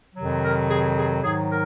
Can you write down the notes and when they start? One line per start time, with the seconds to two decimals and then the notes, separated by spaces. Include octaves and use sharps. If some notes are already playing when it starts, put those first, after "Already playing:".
0.15 F2 C3 D#3 F#3
0.42 A#4
0.69 G#4
0.97 G#4
1.23 G#2 D#3 F#3 G#4
1.50 A#4